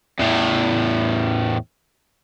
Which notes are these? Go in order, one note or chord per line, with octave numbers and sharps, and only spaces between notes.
E2 A2